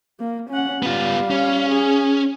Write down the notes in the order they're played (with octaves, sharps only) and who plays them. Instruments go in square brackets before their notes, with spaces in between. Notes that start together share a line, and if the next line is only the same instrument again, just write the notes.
[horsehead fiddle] A#3
C#4 F#5
[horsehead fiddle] G3 F5 [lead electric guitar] B3 F4
[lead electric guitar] C#4
[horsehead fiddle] G#4